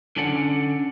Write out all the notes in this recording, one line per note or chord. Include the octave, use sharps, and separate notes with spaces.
D3 C#4 D4 D5 F#5